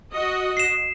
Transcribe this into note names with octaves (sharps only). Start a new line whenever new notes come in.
F#4 D#5
C7 E7